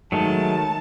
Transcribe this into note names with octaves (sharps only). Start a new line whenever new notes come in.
D#3 F#3 G#3 A3 A5